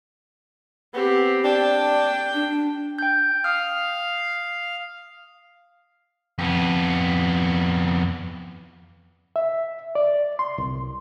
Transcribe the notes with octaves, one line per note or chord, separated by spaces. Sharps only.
B3 C4 G4
D4 G5
D4
G5 G6
F5 D#6 F6
F2 B3
E5
D5
C6
C2